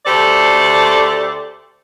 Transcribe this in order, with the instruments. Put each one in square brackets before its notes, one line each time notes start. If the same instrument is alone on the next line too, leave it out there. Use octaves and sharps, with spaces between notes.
[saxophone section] D2 A3 G4 A4 C5 D5